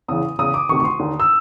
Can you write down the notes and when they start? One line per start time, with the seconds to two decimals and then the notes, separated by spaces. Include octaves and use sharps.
0.08 E2 C#3 E3 D#6
0.39 E2 C#3 E3 D#6
0.54 D6
0.69 D2 C3 D#3 C#6
0.80 C#6
0.84 C6
0.99 D#2 D3
1.20 E6